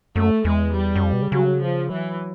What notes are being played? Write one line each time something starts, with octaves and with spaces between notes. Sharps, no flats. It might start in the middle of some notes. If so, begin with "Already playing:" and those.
F#2 A3
E2 G#3
G3
F#2
F2
B2
C#3
C#3 F#3
F3
E3 F#3